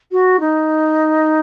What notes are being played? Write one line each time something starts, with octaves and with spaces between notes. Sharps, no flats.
F#4
D#4